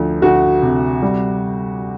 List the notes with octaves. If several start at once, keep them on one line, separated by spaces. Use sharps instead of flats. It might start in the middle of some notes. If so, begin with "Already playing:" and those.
Already playing: D2 F3
D2 F#4
C3
G3